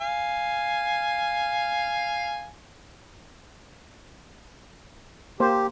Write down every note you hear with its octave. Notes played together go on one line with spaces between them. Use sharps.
F5 G#5
A#3 G4 C5